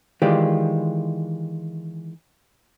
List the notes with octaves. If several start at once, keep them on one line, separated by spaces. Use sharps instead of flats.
D#3 E3 G#3 F4 G4 D5